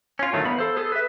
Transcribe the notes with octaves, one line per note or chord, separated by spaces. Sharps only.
C#4 F4
A2 D3 D#3 F#3 A3
E2 B3 F5 B5
A4 C5
B3 G#4 A4
B4 E5